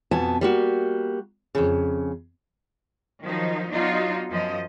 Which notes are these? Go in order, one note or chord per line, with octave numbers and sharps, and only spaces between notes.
F2 B2 B3 G#5 A5
G3 A#3 F#4
F2 A2 C#3
D#3 F3 F#3 D#4
F#3 B3 D4 D#4 F4 F#4
F#2 F3 D#5